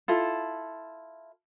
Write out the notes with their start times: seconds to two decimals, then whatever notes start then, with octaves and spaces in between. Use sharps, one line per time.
0.08 E4 F4 A4